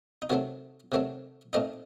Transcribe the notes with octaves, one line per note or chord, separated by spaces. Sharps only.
D#4
C3 D#3 F#3 A3 C4 F#4
C3 D#3 F#3 A3 C4
A#2 A3 C4 D#4 D#5